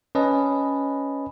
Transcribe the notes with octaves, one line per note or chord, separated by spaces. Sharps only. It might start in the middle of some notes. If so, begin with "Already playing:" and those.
C#4 B4 D#5 A5